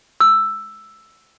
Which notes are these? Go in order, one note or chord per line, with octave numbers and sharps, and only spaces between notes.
E6